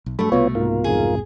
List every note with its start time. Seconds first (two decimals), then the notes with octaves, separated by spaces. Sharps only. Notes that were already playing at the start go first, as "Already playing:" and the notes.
0.06 B1
0.19 G2 C#3 F#3 A3 A4 B5
0.32 C2 B2 B3 F4 C#5
0.55 G#2 A#3 F4 A#4
0.84 G#1 F2 G#2 G#4